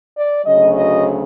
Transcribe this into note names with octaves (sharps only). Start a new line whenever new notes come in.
D5
D2 C#3 F#3 D#5
D#5